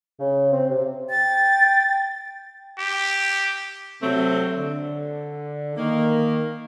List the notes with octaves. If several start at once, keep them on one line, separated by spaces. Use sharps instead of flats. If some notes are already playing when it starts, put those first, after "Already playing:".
C#3
C4
C3
G5 A6
G4
C3 F#3 A3 C4
D3
D#3 A#3